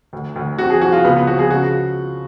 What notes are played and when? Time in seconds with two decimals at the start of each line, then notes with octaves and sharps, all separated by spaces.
0.13 D2
0.36 D2
0.58 F2 F#4
0.70 G#4
0.81 F3 F#4
0.92 F4
1.04 C#2 B3
1.16 B3
1.27 F3 F#4
1.39 G#4
1.50 C#3 F#4